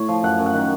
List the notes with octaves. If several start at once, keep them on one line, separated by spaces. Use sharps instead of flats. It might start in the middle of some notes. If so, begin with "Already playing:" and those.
Already playing: A2 C#5
F3
F#2 F#5
F#2
F#5
D#3